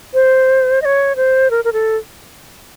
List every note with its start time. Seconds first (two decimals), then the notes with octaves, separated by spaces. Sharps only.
0.14 C5
0.82 D#5
0.85 C#5
1.16 C5
1.51 A#4
1.64 A#4
1.73 A4